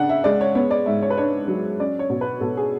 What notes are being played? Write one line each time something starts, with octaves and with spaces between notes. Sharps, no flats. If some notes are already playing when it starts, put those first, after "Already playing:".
Already playing: C#3 D4 F#5
E5
G#3 D5
C#5
B3 C#5
D5
G#2 E5
C#5
B4
D4 C#5
F#3
C#4 D5
C#5
B2
B4
B2 A4
G#4